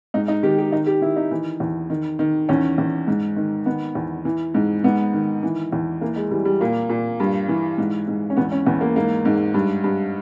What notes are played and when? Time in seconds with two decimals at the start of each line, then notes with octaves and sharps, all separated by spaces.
0.14 G#2 D#4
0.28 D#4
0.43 D#3 G4
0.58 G4
0.72 D#3 D#4
0.87 G4
1.01 D#3 E4
1.16 D#4
1.31 E3 D#4
1.60 E2
1.90 D#3
2.19 D#3
2.49 E2 C#4
2.78 E2
3.07 G#2
3.36 D#3
3.66 D#3 B3
3.95 E2
4.25 E3
4.54 G#2
4.84 G#2 B3
5.13 D#3
5.43 E3
5.73 E2
6.01 E3 A#3
6.16 G#3
6.31 E3 G3
6.45 G3
6.61 A#2 A#3
6.89 A#2
7.20 G2
7.48 E3
7.78 G#2
8.08 G#2
8.30 C#4
8.37 E2 B3
8.52 C#4
8.66 E2 B3
8.81 A#3
8.96 G#2 A#3
9.25 G#2
9.54 G2
9.84 G2